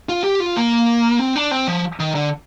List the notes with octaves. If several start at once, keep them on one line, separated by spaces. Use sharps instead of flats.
F4
G4
F4
A#3
C4
D4
C4
F3
D#3
D3